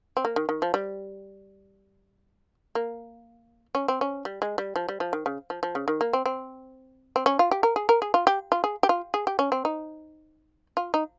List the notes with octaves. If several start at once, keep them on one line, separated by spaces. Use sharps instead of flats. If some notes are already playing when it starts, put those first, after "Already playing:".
C4
A#3
D#3
D#3
F3
G3
A#3
C#4
C4
C#4
G3
G#3
G3
F3
G3
F3
D#3
C#3
F3
F3
C#3
D#3
A#3
C4
C4
C4
C#4
F4
G4
A#4
G#4
A#4
G#4
F4
G4
F4
G#4
G4
F4
G#4
G4
C#4
C4
D#4
F4
D#4